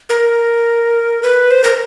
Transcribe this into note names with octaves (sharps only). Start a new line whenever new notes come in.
A#4
B4
C5
A#4